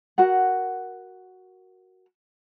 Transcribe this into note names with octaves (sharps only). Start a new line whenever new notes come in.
F#4 A#4 F#5